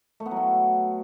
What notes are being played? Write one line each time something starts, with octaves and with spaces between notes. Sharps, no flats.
A3
B3
F#3
A3